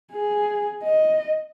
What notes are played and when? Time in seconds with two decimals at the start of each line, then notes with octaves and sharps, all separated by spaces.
0.12 G#4
0.83 D#5